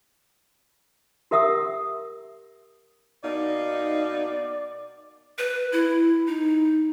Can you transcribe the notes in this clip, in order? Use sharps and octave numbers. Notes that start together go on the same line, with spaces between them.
G4 A#4 E5 F#5 D#6 E6
B2 A#3 D#4 D5
B4
E4
D#4